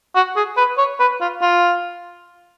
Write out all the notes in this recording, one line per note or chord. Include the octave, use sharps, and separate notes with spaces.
F#4
G#4
B4
C#5
B4
F4
F4